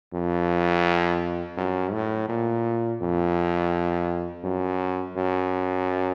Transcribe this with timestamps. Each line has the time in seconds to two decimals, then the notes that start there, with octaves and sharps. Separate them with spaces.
0.14 F2
1.57 F#2
1.93 A2
2.29 A#2
3.02 F2
4.44 F#2
5.17 F#2